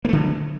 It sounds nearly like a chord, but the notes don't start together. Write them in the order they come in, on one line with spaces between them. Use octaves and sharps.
A#3 A3 D3 F#3